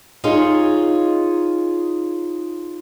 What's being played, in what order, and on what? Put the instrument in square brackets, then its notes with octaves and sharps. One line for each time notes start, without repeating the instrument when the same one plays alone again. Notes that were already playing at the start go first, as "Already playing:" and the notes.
[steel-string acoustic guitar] D#4 F4 G#4 C#5